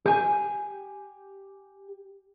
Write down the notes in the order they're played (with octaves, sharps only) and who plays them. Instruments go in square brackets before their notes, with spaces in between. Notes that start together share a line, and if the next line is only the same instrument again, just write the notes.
[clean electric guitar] G4 G#5